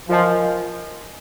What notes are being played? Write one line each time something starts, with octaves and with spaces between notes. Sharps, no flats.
F3 F4 A#4 D#5 G#5